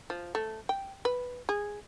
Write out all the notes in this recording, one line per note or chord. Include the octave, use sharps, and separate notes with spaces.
F3
A3
G5
B4
G#4